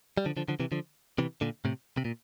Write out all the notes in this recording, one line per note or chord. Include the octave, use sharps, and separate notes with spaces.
G3
D3 F3
D3 F3
D3 F3
C3 E3
D3 F3
C3 E3
A#2 D3
A2 C3
C3
A#2